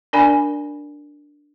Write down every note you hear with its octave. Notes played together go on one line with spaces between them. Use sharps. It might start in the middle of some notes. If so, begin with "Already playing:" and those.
D4 A#4 D5 G#5 B5